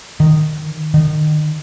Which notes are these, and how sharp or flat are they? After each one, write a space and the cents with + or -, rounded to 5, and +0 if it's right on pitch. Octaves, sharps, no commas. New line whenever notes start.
D#3 -15
D#3 -30